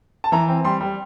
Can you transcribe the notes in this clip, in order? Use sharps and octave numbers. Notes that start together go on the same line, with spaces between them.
A5
E3 A#5
C4
G3 C6
G3